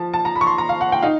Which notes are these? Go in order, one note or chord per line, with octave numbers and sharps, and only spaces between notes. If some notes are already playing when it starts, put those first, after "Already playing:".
Already playing: F3 A5
A5
A#5
B5
C#6
C6
A#5
F5
F#5
G5
D#4 F5